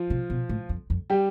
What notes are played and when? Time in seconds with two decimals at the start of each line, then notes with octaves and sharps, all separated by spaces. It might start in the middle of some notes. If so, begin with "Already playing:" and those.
Already playing: F3 F4
0.10 C3
0.30 B2
0.49 A2
0.69 F2
0.90 F2
1.10 G3 G4